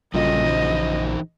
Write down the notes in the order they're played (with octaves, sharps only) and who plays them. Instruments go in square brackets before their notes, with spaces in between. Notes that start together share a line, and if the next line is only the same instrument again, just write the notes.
[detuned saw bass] A#1 [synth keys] F#2 A#2 C#3 [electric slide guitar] G3 A4 [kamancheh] D#5
[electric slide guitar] E3 D#4 C5